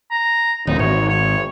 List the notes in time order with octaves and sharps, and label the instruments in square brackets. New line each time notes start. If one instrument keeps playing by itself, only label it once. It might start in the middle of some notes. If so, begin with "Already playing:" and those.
[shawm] A#5
[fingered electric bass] D1 [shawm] D#4
[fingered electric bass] G#1 [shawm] C#5
[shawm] C#5